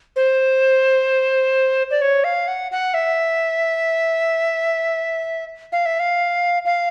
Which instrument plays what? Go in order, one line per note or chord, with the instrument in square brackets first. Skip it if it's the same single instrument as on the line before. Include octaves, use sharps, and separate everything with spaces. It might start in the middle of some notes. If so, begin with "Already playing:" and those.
[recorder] C5
D5
C#5
F5
F#5
F#5
E5
F5
E5
F5
F5